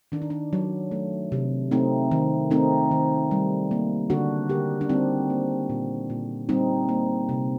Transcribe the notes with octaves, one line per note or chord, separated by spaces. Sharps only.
D#3 D4
D#4
D4
F#3
A3
C3
A3 C4 D#4
D#3
A3 C4 D#4
D#3
G3
A#3
D3 D4 F#4
D3 G4 A#4
D4
G3 C4 D#4
A#3
A#2
A#2
G3 C4 D#4
A#3
C3